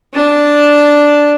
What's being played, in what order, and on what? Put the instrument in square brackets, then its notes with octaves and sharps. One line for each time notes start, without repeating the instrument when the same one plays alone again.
[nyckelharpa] D4 A5